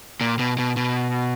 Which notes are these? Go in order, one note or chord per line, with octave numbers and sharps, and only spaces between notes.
A#2
B2
B2
B2